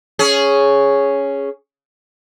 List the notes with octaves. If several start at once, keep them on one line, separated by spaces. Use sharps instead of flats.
C#4 G#4